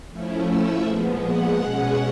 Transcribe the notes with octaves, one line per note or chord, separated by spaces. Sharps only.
F3 A3 C#4 E4
E5
A#2 F3 G#3 B3
F#5
B2 G#3 C#4 F#5